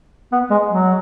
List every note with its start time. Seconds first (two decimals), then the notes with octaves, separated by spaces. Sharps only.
0.32 B3
0.51 G#3
0.70 F#3